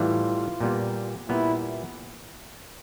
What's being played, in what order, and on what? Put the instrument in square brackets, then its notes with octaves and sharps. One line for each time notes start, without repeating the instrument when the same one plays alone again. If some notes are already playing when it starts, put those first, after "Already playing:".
Already playing: [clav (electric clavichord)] A2 E3 G3 [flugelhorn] F4
[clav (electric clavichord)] A#2 G3 B3
[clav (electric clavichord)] A#2 G3 B3 [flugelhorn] E4